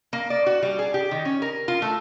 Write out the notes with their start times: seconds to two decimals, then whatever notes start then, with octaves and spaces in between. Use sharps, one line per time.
0.13 A#3
0.30 D5
0.46 F#4
0.62 G3
0.79 G#4
0.94 G4
1.11 D#3
1.25 C#4
1.42 A#4
1.68 F4
1.82 A3